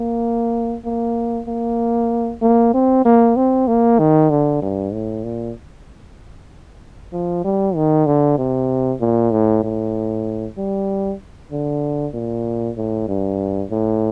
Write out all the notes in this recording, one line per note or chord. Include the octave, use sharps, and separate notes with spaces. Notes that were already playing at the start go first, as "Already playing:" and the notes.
Already playing: A#3
A#3
A#3
A#3
C4
A#3
C4
A#3
D#3
D3
G2
A2
A#2
F3
G3
D#3
D3
C3
A#2
A2
A2
G3
D3
A#2
A2
G2
A2